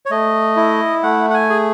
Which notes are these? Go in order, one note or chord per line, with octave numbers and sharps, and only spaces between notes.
C#5
A3 D#5
E4
A3 F#5
F#5
G#5
G#4